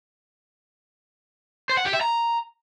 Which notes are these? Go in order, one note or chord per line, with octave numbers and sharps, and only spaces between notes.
C5
F#5
G4
E5
A#5